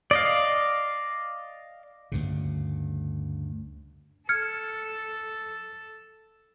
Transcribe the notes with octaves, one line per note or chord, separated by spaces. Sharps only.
D5 D#5 F5
D2 G2 C#3
A4 F6 G#6 C#7